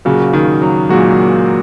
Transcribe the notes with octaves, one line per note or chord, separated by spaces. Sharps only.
A#2 C#3 F#3 A#3 F#4
D#3
F#3
A#2 F#3 G#3 A#3 F#4